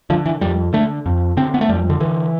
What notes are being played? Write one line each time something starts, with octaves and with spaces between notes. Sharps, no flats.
D3 F3
E3
F2 G3
D3 A3
F2
D3 C4
B3
A3
F2 G3
D3
D3 E3